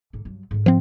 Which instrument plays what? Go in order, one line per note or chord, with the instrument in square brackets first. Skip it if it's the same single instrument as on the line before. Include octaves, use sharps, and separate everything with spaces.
[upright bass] G#2 D3
G2 F#3
G#2 D3
[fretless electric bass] F3 C4